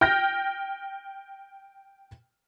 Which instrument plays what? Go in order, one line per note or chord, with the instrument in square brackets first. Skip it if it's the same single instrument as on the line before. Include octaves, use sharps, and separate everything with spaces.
[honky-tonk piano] G5 F6 G6 A#6